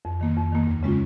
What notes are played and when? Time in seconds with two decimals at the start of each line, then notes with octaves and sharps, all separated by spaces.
0.05 F2
0.21 D#3 A#3
0.37 F2
0.52 D#3 A#3
0.67 D#2
0.83 C#3 G#3 C#4 F4